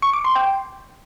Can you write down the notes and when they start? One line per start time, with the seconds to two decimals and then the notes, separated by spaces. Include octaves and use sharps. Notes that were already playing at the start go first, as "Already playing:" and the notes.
0.02 C#6
0.13 D6
0.25 C6
0.36 G5